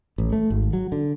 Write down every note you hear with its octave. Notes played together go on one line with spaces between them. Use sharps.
A1
A3
G#1
F#3
D3